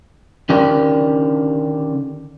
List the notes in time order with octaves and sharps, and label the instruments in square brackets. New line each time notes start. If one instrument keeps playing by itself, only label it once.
[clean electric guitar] D3 D#3 C#4 G4 A#4 D5